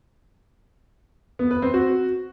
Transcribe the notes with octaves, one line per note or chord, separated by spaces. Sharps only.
B3
B4
C4
F#4